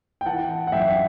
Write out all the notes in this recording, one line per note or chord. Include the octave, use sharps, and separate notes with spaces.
G5
E3 F#5 A5
F#5
F#2 E5 G5